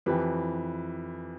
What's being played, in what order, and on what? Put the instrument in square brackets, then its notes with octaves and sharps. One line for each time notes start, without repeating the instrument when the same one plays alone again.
[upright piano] F2 E3 G4 B4